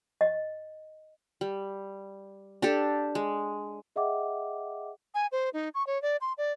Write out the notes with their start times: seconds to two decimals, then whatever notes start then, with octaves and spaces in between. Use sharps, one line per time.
0.21 D#5
1.41 G3
2.62 D4 G4 A4
3.15 G#3
3.96 G#4 D#5 E5 F#5 G5 D6
5.14 G#5
5.32 C5
5.53 D#4
5.75 C#6
5.87 C#5
6.02 D5
6.21 C6
6.38 D5